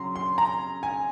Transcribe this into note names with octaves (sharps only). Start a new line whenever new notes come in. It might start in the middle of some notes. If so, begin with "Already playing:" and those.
Already playing: C#3 F#3 C#4 A#5 C6
C6
A#5
G#5